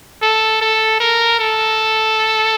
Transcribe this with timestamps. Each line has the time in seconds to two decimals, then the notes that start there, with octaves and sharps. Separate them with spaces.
0.22 A4
0.61 A4
1.00 A#4
1.39 A4